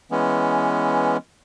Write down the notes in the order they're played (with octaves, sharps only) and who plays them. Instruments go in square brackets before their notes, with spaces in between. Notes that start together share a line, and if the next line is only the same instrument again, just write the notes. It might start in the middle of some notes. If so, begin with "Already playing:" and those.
[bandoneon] E3 G#3 B3 C#4